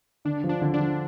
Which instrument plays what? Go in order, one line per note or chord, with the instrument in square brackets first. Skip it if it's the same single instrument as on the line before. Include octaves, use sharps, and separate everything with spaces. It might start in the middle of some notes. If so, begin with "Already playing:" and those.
[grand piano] D3 [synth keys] D4
[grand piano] F3
[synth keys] D4
[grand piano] D3
[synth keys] D4
[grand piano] F3